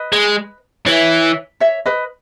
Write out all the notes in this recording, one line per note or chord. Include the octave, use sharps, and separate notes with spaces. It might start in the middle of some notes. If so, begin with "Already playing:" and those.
Already playing: B4 D#5
G#3
E3 C#5 E5
C#5 E5
B4 D#5